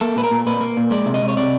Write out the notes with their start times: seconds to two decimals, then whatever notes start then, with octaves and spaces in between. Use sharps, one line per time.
0.01 A#3 A4
0.16 A#2 B4
0.24 A#4
0.31 A#2
0.46 A#2 B4
0.61 A#3
0.77 A#2
0.91 G#3 D5
1.06 C3
1.14 D#5
1.22 C3
1.28 C#5
1.37 C3 D5